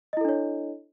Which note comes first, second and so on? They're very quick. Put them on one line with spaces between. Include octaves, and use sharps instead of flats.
D#5 E4 A4 D4 C#5